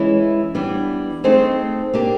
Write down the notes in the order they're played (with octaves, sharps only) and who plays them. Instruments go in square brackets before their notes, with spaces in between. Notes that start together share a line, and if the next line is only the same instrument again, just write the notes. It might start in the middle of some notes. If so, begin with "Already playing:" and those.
Already playing: [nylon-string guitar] E3 G#3 C#4 E4
E3 G3 B3 D4
A3 C4 D#4 G#4 C5
A#3 D4 G4